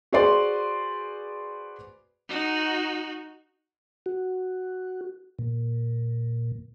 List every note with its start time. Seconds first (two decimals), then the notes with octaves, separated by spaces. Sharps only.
0.13 F#4 G#4 B4 C5 D5 C6
2.29 D#4 F#4
4.06 F#4
5.39 A#2